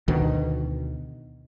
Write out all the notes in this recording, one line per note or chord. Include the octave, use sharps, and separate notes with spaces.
D2 B2 D#3